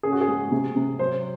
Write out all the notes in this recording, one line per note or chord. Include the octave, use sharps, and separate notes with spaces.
C#3 G#4
F#4
G#4
G#3
C3
C3
F#3 C5